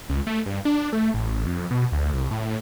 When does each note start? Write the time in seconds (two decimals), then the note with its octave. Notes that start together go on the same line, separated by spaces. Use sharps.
0.09 C#2
0.27 A3
0.46 G2
0.65 D4
0.93 A3
1.14 A1
1.46 F2
1.71 B2
1.92 D2
2.14 C2
2.31 A2